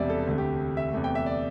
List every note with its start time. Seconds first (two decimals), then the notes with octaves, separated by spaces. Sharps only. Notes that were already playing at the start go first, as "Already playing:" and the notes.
Already playing: E1 E2 C3 G3 D5 E5
0.10 A4
0.27 D2 C3 A3
0.38 G4
0.77 E5
0.93 E2 C3 A3
1.04 G5
1.15 E5
1.26 D5